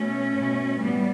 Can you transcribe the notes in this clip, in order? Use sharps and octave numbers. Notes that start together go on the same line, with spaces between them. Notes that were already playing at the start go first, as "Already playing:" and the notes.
Already playing: B2 A3 C#4
B2
A2 E3 G3 B3